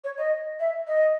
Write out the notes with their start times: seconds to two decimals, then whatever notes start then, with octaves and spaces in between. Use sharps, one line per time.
0.04 C#5
0.18 D#5
0.60 E5
0.87 D#5